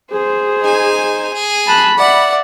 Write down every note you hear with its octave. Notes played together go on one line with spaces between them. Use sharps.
G#4 C5
D#4 G#5
G#4
A5 B5 F#6
D5 E5 F#5